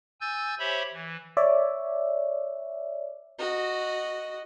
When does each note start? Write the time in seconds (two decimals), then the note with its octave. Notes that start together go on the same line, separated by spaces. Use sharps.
0.21 G#5 E6 G6 A6
0.59 G4 C5 C#5 E5 B5
0.93 E3
1.37 C#5 D5 E5
3.38 F#4 D#5